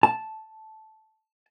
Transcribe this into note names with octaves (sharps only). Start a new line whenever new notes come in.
A5